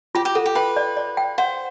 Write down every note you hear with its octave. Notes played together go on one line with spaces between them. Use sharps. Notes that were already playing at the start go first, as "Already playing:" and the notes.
F4 G4
G4
F#4 A4
G4
B4 G5
D5
D5
G5
C5 F#5